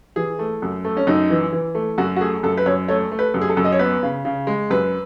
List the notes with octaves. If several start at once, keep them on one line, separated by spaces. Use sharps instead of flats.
E3 G#4
A3
F#2
A3
C#4
F#2 D#4
E3
E3
A3
F#2 F#4
F#4
A3 G#4
F#2 A4
B4
F#2 C#5
A3 C#5
A3
B4
F#2
G#4
A4
F#2
D#5
C#5
B3 B4
C#3
C#3
G#3
F#2 B4